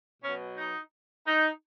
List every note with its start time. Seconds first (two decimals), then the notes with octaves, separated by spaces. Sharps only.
0.23 B2 F#3 C#4
0.57 D#4
1.27 D#4